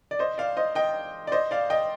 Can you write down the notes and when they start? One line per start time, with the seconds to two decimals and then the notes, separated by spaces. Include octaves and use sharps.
0.11 D5
0.19 C5 D#5
0.38 D5 F5
0.57 C5 D#5
0.75 D#5 G5
1.27 D5
1.32 C5 D#5
1.51 D5 F5
1.70 D#5 G5